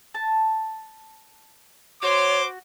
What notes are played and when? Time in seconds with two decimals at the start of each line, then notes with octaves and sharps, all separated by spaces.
0.14 A5
2.03 F#4 C5 C#5 C6 D6